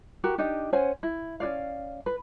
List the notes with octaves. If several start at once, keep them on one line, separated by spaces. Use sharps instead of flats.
F#4 G4 A#4
D4 D#4 G4 D#5
C#4 C5 F#5 G#5
E4
C#4 F#4 D5 F5
B4